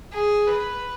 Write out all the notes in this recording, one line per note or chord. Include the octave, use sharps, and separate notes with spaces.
G#4
B4